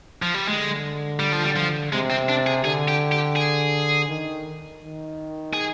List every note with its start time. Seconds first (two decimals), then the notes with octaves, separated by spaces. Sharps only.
0.22 F3
0.34 G3
0.48 D3 G#3
1.19 G3
1.32 F3
1.44 G3
1.56 F3
1.92 C3 G#3
2.10 C4
2.29 D4
2.47 G#4
2.64 D3 G#4
2.88 G4
3.12 G4
3.36 G#4
4.09 D#3
4.81 D#3
5.53 G#4